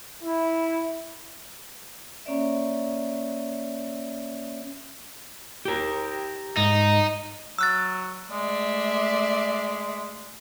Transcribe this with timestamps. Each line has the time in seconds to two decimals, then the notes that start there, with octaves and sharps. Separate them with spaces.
0.23 E4
2.25 A#3 C#4 C#5 D5 E5
5.65 G4 A#4
6.57 G#2 D#4
7.59 F#3 E6 F#6 A6
8.31 G#3 A3 D5 E5